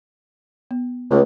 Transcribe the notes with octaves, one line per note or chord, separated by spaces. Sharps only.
B3
C#2 A3 G#4 B4